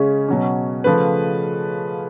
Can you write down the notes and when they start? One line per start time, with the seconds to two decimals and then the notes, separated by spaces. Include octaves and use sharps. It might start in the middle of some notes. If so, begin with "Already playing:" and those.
Already playing: C#3 G#3 C#4
0.28 B2 F#3 C#4
0.84 C#3 F3 A3 B4